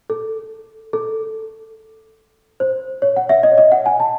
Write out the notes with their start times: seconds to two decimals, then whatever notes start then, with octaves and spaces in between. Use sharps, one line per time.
0.10 A4
0.93 A4
2.60 C5
3.02 C#5
3.16 F#5
3.29 E5
3.43 D#5
3.52 C#5
3.58 D#5
3.72 F#5
3.86 G#5
4.00 A5